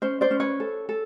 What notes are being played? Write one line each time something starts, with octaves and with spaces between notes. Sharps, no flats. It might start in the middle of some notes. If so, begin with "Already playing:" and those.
C#4 C5
C5 D5
C#4
B4 C#5
A4
A4